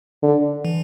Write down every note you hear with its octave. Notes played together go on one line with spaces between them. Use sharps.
D3
E3